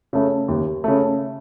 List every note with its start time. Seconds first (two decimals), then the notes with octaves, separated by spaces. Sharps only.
0.13 C#3 A3
0.48 D#2
0.84 C#3 A3